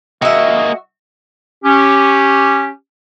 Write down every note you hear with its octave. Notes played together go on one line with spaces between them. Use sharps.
A#3 F#4 G#4 D#5 E5
C#4 G4